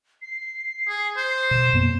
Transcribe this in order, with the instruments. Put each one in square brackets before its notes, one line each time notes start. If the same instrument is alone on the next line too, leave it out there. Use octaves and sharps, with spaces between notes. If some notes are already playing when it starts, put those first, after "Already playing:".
[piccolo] C7
[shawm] G#4
C5
[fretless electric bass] B2 [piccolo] E7
[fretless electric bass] F#2 A#3 B3